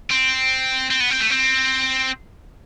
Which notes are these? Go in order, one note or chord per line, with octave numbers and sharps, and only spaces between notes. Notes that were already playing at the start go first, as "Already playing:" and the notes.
C4
C4
B3
C4
A3
C4